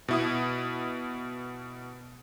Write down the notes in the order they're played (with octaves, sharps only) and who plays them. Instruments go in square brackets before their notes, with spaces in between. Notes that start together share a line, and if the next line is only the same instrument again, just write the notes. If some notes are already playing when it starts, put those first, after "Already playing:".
[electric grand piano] B2 E4 D#6